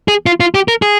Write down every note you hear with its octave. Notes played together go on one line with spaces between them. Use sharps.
G#4
F4
F4
G4
A#4
G#4